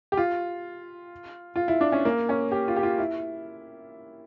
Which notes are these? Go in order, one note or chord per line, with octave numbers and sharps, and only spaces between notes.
G4
F4
F4
E4
D4
C#4
A#3
C#4
G4
F4
G4
F4
E4